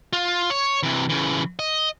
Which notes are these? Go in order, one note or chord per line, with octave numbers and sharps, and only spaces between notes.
F4
C#5
C3 E3
C#3 E3
D#5